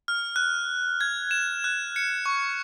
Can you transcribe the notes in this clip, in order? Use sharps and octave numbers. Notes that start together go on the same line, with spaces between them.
F6
F#6
G#6
E7
F#6
C#7
C#6